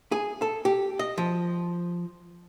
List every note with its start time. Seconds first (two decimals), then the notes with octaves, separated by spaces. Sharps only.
0.12 G#4
0.42 A4
0.65 G4
0.99 D#5
1.18 F3